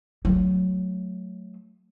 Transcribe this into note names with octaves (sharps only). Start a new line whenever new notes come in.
F#3 A3